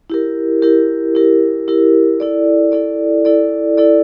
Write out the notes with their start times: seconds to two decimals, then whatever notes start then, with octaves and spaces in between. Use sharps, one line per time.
0.10 E4 G4 A#4
0.62 E4 G4 A#4
1.15 E4 G4 A#4
1.68 E4 G4 A#4
2.20 E4 A4 D5
2.72 E4 A4 D5
3.25 E4 A4 D5
3.78 E4 A4 D5